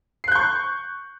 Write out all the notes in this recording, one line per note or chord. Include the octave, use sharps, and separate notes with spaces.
C#6 F#6 G6 C7